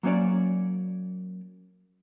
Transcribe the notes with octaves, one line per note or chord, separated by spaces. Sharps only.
F#3 A#3 C#4 C#5 D5